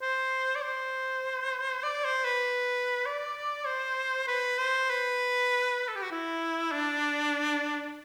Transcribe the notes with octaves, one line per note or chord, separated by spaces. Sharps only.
C5
D5
C5
D5
C5
B4
D5
C5
B4
C5
B4
A4
G4
F#4
E4
D4